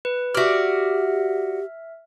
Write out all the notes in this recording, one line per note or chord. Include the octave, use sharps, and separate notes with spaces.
B4
F#4 G4 D5 E5 F6